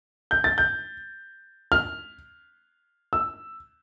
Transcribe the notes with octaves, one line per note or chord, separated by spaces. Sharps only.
G6
A6
G6
F6
E6